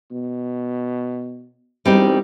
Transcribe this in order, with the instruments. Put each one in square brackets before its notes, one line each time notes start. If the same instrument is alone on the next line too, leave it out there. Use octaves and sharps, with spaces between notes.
[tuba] B2
[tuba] E1 [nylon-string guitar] G3 C4 D#4